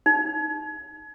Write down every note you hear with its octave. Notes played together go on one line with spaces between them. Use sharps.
D#4